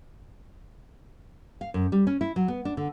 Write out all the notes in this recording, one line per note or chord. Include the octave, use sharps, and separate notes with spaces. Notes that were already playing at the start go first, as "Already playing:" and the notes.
F5
F#2
G3
C#4
E4
F#3
B3
D4
D3